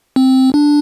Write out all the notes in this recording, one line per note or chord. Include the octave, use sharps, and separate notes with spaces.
C4
D4